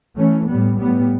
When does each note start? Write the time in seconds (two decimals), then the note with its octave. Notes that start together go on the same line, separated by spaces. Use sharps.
0.16 E3 A3 C#4
0.47 A2 G3 B3
0.79 A2 G3 B3